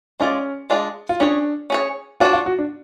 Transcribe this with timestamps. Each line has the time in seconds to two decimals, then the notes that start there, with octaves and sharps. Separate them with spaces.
0.20 G#3 C#4 D4 F4 G#4 D5
0.70 G#3 D4 F4 G#4 D5
1.09 F4
1.20 C#4 D4 G#4 C#5
1.70 C#4 G#4 C#5
2.20 D4 F4 F#4 C#5
2.33 F4
2.46 F#4
2.59 D4